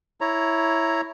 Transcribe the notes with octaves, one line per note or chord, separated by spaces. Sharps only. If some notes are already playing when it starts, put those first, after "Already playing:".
E4 C#5 A#5